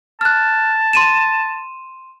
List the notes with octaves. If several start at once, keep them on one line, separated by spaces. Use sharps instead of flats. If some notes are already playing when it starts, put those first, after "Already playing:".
A5 F6 F#6
C6 D#7 E7